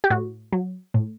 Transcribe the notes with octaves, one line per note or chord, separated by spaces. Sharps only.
G4
A2 F#4
F#3
A2